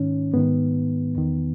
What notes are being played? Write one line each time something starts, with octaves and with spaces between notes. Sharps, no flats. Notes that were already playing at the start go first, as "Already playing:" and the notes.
Already playing: G#2 D#3 C#4
G#2 D#3 B3
E2 D#3